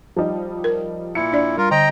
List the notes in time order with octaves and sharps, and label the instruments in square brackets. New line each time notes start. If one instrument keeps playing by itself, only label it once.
[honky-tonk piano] F3 G3 D#4
[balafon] A#4
[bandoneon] A#2 E4 [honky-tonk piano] C#7
[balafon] D4 D5
[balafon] G3 [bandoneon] F4 A#4
[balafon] D3 [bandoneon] D#5 G5 A#5